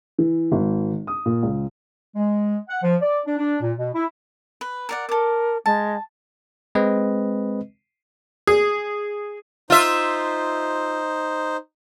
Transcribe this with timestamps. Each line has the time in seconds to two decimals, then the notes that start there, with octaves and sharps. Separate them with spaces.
0.19 E3
0.52 G#1
1.07 D#6
1.26 A#2
1.43 C#2
2.16 G#3
2.69 F#5
2.82 F3
3.00 D5
3.25 D4
3.37 D4
3.61 A#2
3.78 B2
3.94 E4
4.61 B4
4.89 A#4 D5 F#5
5.09 A4 A#4 D6
5.66 G#3 A5
6.75 G#3 C4 B4 D#5
8.47 G#4
9.70 D#4 F4 C5 E5